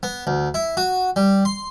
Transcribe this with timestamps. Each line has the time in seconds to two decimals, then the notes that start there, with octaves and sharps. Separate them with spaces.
0.03 B3
0.27 D2
0.54 E4
0.77 F#4
1.16 G3
1.45 C6